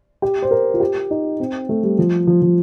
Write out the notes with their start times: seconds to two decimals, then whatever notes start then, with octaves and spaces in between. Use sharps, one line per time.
0.22 G4
0.42 C5
0.51 A#4
0.74 F4
0.80 G4
1.11 D#4
1.40 C4
1.69 A3
1.83 G3
1.99 F3
2.27 F3
2.42 F3